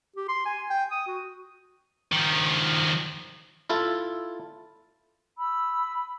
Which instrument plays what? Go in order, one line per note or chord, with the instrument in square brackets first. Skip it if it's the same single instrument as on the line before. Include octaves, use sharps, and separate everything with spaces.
[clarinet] G4
C6
G#5
G5
D#6
F#4
[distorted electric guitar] D#3 F3
[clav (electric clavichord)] E4 F4 A4
[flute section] B5 E6